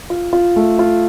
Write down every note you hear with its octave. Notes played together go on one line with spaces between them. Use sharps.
F4
F4
A3
F4